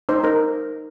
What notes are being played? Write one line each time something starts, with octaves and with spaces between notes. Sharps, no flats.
D#4 C5
D#4 A#4